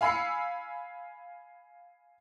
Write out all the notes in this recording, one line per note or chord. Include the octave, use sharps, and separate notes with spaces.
F5 G#5 B5 E6 C7 C#7